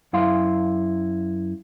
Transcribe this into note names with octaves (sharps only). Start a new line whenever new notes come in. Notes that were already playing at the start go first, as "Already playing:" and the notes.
F#2 E4 F5 C6